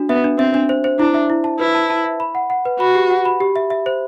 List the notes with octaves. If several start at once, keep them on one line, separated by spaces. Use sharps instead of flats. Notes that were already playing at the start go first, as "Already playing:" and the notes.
Already playing: D4 F#4
B3 E5
D4
C4 E5
D4
C5
C5
D4 E4
E5
E4
A5
E4 B4
A5
A5
E5
B5
F#5
F#5
B4
F#4 B5
G4
F#5
B5
G4
E5
E5
C5